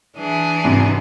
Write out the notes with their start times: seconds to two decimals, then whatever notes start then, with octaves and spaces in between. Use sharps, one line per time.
0.16 E3 D4 G#4
0.64 G#1 F#2 C3